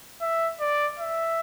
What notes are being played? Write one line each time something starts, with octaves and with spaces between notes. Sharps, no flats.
E5
D5
E5